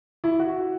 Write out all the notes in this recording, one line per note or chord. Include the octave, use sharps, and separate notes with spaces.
E4
F#4